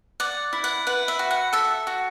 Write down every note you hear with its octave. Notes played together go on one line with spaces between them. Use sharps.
D5 F#5
E4
F#5
B4 F#5
E5
F#4
F#5
A4 E5
F#4